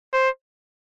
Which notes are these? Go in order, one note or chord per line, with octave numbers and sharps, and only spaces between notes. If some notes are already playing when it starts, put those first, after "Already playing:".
C5